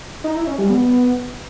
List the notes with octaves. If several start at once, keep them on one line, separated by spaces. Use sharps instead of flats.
D#4
E4
C#4
G3
B3